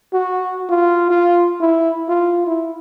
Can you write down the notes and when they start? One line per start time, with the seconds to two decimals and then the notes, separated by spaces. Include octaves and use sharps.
0.13 F#4
0.69 F4
1.10 F4
1.61 E4
2.09 F4
2.46 E4